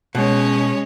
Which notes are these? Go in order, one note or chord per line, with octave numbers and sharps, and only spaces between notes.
B2 G#3 C#4 C#5